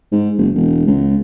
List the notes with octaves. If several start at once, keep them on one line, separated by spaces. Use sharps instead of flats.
G#2
F#1
E1
C#2